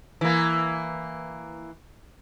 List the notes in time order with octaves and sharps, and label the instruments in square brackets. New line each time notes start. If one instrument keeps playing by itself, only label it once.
[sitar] E3 A#3